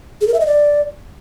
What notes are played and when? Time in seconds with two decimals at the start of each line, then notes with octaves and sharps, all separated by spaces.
0.21 G#4
0.28 A#4
0.34 E5
0.40 D#5
0.47 D5